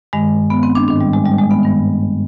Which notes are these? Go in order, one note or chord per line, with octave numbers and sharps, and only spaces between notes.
G2 D#3 G#3
B3
C4
D4
G#2 D#3 D4
G3
G#3
G3
G#3
B3
G2 D#3